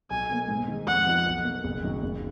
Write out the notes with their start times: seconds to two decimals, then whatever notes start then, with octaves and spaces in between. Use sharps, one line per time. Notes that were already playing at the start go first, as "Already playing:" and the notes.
0.10 B1 G#5
0.30 B2 A#3
0.48 G#2
0.68 D#3 G#3
0.87 F2 F#5
1.06 F3 B3 D#4
1.26 B1
1.45 B2 A#3
1.64 F#1
1.83 F#2 D#3 F#3
2.03 F#1